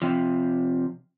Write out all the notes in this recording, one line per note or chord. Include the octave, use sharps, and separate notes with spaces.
C3 F3